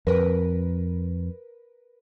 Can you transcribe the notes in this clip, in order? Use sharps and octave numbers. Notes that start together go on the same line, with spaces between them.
F2 A#4 B4